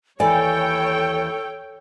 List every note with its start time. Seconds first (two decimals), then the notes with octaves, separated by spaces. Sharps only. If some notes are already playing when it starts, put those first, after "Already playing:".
0.20 D#2 E3 A4 C#5 D5 G5 G#5